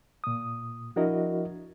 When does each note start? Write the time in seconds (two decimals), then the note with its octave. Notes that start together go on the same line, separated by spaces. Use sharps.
0.24 A#2 D#6
0.96 F3 D4 E4 F#4 A#4 D#5